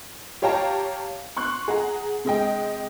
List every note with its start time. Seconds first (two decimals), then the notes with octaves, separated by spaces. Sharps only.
0.42 G4 C#5 F5 G5 A5 A#5
1.37 C6 C#6 F#6
1.68 G#4 F#5 A#5
2.25 C3 G#3 D#5 G5